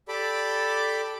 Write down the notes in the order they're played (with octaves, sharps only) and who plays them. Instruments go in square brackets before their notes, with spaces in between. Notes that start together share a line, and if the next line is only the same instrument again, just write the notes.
[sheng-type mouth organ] G4 A4 D5 B5 D6